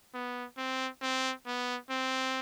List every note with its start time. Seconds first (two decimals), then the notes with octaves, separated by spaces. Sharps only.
0.14 B3
0.57 C4
1.02 C4
1.46 B3
1.90 C4